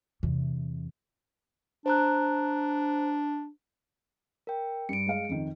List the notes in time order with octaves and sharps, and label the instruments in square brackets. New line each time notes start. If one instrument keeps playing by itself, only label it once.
[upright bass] E2 C3
[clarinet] D4 [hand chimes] C5 A#5 F#6
[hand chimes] A#4 G5
[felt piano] G2 [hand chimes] C#7 D7
[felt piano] G#3 F5
F2 D#3